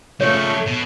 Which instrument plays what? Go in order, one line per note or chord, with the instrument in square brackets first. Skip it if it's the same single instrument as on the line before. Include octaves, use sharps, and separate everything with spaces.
[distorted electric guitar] C#3 F3 [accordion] A3 C#6 [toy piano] C#5
[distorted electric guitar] B2